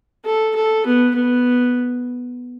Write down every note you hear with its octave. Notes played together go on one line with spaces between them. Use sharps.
A4
A4
B3
B3